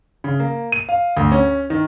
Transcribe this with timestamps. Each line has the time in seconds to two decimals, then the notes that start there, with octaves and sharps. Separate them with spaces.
0.24 C#3
0.40 A#3
0.72 D#7
0.89 F5
1.17 D2
1.32 C#4
1.70 D#3